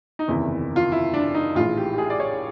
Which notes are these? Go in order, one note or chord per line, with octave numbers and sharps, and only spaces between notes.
D#4
F#1 E2 C3 D#3 E4
F4
E4
D4
D#4
A#1 A2 E3 G#3 F4
G4
G4
G#4
D5
C#5